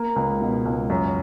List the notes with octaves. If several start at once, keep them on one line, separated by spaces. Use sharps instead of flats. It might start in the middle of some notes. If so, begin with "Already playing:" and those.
Already playing: A#3
C#2
B2
C#2
F#2